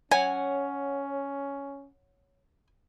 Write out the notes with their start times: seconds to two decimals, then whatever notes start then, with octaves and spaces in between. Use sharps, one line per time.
0.11 C#4 C#5 F#5 G#5